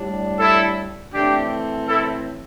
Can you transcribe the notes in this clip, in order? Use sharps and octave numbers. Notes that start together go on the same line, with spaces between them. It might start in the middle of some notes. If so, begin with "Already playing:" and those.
Already playing: A2 G3 D4
E4 A4
A2 E3 A3 C4 D4 G4
E4 A4